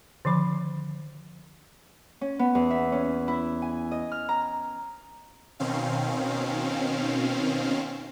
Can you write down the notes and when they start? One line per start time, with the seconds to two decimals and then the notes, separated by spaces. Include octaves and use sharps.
0.25 D3 D#3 F3 B5
2.21 C#4
2.39 B3
2.55 E2
2.71 E5
2.92 C#4
3.28 E4
3.62 G#5
3.91 D#5
4.12 F6
4.29 A#5
5.59 B2 D#3 C4 C#4 F5